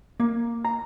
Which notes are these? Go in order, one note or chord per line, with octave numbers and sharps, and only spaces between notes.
A#3
A#5